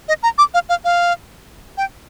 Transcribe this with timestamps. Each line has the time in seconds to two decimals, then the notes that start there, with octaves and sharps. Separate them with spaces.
0.08 D#5
0.23 A#5
0.38 D6
0.54 F5
0.69 F5
0.85 F5
1.78 G5